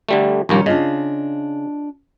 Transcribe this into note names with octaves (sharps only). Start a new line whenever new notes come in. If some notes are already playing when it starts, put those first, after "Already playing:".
D3 G3 A3
A#1 D#2 D#3 G3 A#3 C#4
C#3 D4 F4 D#5